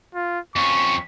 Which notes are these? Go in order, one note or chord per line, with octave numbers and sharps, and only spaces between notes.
F4
F2 C#4 C#6